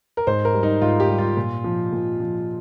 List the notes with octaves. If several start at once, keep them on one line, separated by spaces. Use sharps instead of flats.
A#4
G#2 C5
A#4
G3
D#4
G#2 F4
G4
G3
F4
A#2
F3
A#2
F3